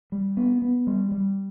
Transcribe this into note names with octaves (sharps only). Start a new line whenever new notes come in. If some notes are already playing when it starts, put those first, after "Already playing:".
G3
B3
B3
G3
G3